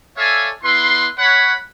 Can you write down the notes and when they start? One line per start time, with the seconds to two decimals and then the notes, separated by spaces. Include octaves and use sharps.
0.18 A4 C#5 D5 E5 F5 G#5
0.64 B3 E4 B4 C6
1.18 C#5 F#5 B5